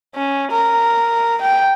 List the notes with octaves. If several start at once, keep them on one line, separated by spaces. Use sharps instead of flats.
C#4
A#4
G5